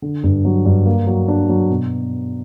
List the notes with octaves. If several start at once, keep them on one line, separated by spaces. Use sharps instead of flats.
D3
G2
F#3
G2
A#3
F#3
D4
F#3
B2